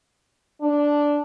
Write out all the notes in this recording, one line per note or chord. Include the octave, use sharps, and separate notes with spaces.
D4